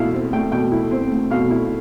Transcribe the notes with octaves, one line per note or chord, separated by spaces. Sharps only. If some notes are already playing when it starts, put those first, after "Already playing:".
Already playing: B2 A3 E4 F5
C4
A3 G5
B2 G5
E4
C4
A3
B2 F5
E4